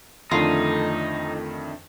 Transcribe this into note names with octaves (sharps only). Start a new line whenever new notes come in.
F2 D3 D#3 A3 D4 D#4 F4